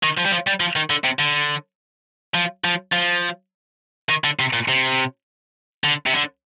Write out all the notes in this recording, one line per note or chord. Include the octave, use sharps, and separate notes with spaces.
D#3
F3
G3
F3
G3
F3
D#3
D3
C3
D3
F3
F3
F3
D#3
D3
C3
A#2
C3
D3
C3
D3